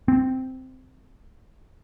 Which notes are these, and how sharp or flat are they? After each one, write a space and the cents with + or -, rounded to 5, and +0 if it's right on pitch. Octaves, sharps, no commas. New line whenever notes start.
C4 -10